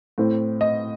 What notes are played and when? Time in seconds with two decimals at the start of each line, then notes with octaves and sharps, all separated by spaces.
0.18 A2 A3 C4
0.61 D#5